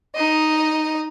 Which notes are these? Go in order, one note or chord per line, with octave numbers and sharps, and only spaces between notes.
D#4 D#5